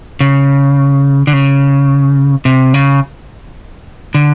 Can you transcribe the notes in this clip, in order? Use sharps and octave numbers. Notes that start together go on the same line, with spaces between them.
C#3
D3
C#3
C3
C#3
D3